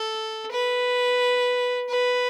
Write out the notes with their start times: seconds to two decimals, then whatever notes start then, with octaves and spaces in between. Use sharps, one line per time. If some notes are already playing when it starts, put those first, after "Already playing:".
Already playing: A4
0.52 B4
1.89 B4